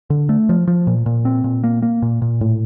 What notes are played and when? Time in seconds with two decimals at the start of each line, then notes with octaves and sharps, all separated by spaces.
0.10 D3
0.29 A3
0.49 F3
0.67 F3
0.87 A#2
1.06 A#2
1.25 C4
1.44 A#2
1.64 A#3
1.82 A#3
2.02 A#2
2.22 A#2
2.41 A2